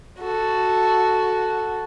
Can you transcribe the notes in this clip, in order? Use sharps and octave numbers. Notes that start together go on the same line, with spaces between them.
F#4 A4